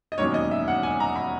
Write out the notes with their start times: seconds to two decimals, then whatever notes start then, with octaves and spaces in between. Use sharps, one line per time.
0.12 D#5
0.18 E1 D#2 D#3 F#3 C#4 C#5
0.34 D#5
0.51 E5
0.68 F#5
0.83 G#5
1.00 A#5
1.16 B5